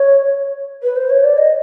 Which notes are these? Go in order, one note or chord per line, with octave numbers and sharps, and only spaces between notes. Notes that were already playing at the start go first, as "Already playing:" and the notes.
Already playing: C#5
B4
C5
C#5
D5
D#5